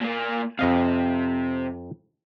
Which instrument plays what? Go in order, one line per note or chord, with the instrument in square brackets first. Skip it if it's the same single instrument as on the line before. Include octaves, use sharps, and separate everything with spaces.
[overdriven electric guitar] A#2 A#3
[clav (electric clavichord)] F2 D#5 F5 [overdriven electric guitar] C3